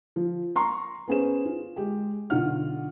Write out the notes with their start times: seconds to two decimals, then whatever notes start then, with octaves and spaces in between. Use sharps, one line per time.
0.16 F3
0.56 A#5 C6 C#6
1.08 B3 C#4 G#4 C5 E7
1.45 F4
1.76 G#3 G4 G#4
2.30 B1 D3 F4 F#5 F6